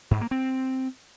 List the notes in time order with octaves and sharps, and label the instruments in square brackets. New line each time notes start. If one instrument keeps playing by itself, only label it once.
[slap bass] G#2
A#3
C4